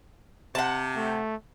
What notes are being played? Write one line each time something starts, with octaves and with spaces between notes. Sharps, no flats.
C3 F#5 A5
A3